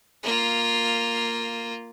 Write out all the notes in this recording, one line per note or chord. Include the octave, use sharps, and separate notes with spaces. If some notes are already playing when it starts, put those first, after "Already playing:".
A#3 F4